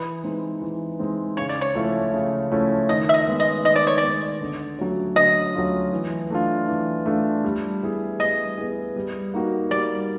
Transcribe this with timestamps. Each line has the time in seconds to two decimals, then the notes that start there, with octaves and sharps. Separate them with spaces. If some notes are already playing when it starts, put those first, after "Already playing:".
Already playing: E3 B4
0.24 G#3 C4 D#4
0.62 E3
0.99 G#3 C4 D#4
1.37 C#3 C#5
1.49 D5
1.61 C#5
1.75 F3 A3 C#4 E4
2.13 C#3
2.52 F3 A3 C#4 E4
2.89 D#3 D#5
3.09 E5
3.14 D#5
3.27 G#3 B3
3.40 D#5
3.65 D#3 D#5
3.76 D5
3.87 C#5
3.98 D5
4.03 G#3 B3
4.41 D3
4.79 F#3 A3 C#4 F4
5.16 D3 D#5
5.55 F#3 A3 C#4 F4
5.93 E3
6.30 A3 D4 F4
6.68 E3
7.06 A3 D4 F4
7.44 G3
7.82 B3 E4 G#4
8.19 G3 D#5
8.58 B3 E4 G#4
8.96 G3
9.34 A#3 D#4 F#4
9.71 G3 D5